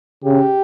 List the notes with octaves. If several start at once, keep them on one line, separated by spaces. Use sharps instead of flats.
C#3 G4